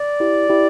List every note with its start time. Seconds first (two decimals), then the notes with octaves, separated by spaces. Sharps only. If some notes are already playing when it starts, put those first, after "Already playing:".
Already playing: D5
0.20 E4 G4
0.49 E4 G4